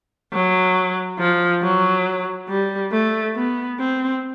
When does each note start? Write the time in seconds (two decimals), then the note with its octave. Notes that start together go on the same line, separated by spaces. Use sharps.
0.33 F#3
1.19 F3
1.62 F#3
2.49 G3
2.92 A3
3.35 B3
3.79 C4